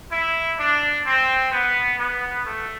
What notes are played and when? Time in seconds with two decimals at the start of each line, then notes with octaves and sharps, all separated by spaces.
0.12 E4
0.59 D4
1.06 C4
1.52 B3
1.99 B3
2.46 A3